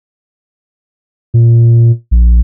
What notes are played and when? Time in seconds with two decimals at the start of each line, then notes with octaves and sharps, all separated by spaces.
1.34 A#2
2.11 A#1